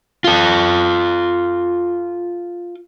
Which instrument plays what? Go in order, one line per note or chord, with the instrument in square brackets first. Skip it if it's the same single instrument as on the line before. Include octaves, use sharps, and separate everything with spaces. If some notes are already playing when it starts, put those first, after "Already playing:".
[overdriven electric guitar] F4 A4